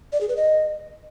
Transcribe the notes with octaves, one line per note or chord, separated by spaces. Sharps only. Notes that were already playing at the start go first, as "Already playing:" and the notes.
D5
G#4
B4
D#5